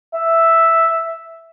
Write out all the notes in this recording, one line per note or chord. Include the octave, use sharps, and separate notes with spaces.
E5